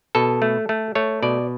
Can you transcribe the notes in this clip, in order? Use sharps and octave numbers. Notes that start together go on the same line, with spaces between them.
B2 A4
A3
A3
A3 C#5
B2 D5